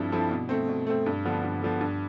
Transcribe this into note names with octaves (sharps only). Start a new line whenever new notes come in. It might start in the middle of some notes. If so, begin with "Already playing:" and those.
Already playing: G2 F3 C4 E4 A4
F3 C4 E4 A4
B2
A3 C4
B2
A3 C4
G2
D3 F3 B3
G2
D3 F3 B3
G2